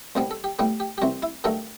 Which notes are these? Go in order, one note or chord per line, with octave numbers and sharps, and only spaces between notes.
C2 B2 G3 B3 C5
A4
G4
A2 G3 B3 G4
G4
G4
C2 C3 E3 F#4
E4
G2 D#3 F#3 A3 A4